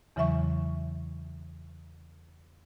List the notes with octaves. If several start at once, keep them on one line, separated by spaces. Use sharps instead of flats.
E2 C#3 E3 F#3 E5 C#6